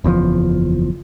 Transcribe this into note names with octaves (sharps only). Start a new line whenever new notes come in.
F#1 E2 C3 F3